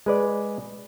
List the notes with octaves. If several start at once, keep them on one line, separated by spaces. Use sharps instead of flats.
G#3 B4 D5